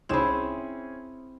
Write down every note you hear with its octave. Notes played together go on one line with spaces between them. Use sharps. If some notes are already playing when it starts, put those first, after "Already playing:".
C2 C4 C#4 D#4 E4 G#4 C5 E7